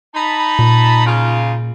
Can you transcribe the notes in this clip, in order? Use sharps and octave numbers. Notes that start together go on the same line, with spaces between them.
D#4 A5 B5
A#2
C#3 D#4 F4